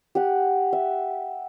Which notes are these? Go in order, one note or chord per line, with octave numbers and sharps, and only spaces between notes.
G4 F#5
E5